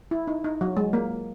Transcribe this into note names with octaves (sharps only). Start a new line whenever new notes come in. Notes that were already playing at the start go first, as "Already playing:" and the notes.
E4
D#4
D#4
F#3
G#3
A#3